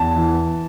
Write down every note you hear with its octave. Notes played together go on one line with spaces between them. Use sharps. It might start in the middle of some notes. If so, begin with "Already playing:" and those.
Already playing: E2 A5
E3